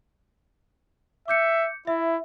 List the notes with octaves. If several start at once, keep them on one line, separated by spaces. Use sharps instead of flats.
E5 D6 G6 C#7
E4 E5